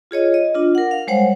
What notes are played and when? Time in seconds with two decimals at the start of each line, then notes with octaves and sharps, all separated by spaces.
0.11 F4 G#4 C#5 D#5
0.34 D#5
0.55 D4 F4
0.75 A#4 F#5
0.91 F5
1.07 G3 G#3 C5 C#5 F#5